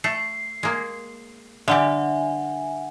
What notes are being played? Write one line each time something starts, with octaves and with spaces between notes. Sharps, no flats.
A3 C7
G#3 A#3
D3 G3 G4 E5 F#5 G#5